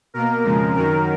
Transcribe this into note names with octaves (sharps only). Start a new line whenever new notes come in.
B2 A#3 A#4
F2 C#3 G#3
F#2 D#3 F#3 A#4